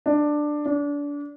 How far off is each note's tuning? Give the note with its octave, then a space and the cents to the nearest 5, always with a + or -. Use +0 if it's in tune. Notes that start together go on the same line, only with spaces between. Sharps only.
D4 +10
D4 -30